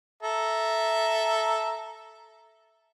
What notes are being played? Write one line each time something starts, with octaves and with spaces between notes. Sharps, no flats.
A4 E5 A#5